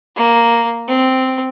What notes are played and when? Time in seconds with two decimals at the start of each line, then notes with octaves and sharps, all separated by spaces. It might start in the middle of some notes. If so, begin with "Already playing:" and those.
0.16 A#3
0.88 C4